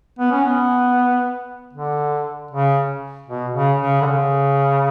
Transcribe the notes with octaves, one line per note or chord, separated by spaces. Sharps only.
B3
C#4
B3
D3
C#3
B2
C#3
C#3
D3
C#3